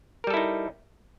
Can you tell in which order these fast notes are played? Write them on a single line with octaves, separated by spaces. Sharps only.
A#4 G3 A4 E4 D#4